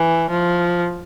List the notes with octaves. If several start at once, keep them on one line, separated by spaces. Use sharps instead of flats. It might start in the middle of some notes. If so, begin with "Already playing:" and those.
Already playing: E3
F3